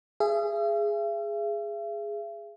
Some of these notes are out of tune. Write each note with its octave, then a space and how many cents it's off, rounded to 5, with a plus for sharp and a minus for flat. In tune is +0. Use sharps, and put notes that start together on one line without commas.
G#4 +0 E5 +45